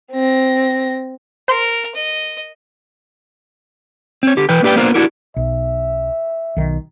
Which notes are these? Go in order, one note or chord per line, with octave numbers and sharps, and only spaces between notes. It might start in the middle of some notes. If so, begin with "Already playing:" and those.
C4 A#6
A#4 C5 C6
D#5
C4 C#5
D3 G4
E3 B4 G5
A#3 D4 G4 B4 D5 G5
A#3 B3 D4 F4 A#4 C5
D4 E4 F#4 G4 A#4
B1 E5
B1 D#3